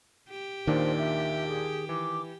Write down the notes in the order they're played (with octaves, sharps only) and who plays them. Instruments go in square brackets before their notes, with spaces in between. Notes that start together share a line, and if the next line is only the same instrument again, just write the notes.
[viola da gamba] G4
[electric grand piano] D#2 A#2 D4 [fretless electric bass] D#3 [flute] C5
[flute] E5
G#4
[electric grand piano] E3 [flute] D6